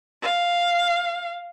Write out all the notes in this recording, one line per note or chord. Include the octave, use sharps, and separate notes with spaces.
F5